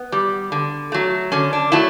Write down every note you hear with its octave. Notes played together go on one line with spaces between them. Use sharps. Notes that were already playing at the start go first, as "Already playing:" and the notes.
Already playing: B3
G3
D3
F#3 A3
D3 C#4
D4
F#3 A3 E4